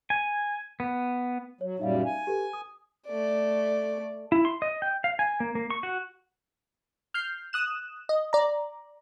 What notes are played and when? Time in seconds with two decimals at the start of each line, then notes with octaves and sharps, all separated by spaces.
0.10 G#5
0.80 B3
1.61 F#3 C#5
1.79 F#2 A#2 G3 D#4 E5 F5
2.05 G#5
2.27 G4 A4 B4
2.53 D#6
3.07 A3 D5
4.32 E4
4.45 C6
4.62 D#5
4.82 G5
5.04 F5
5.19 G#5
5.40 A#3
5.55 A#3
5.70 C#6
5.83 F#4
7.14 F6 G6 C7
7.53 D#6 F#6 E7
8.09 D#5
8.33 D5 A#5